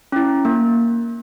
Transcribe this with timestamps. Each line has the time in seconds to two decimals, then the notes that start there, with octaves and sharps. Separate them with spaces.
0.12 C#4 E4
0.45 A#3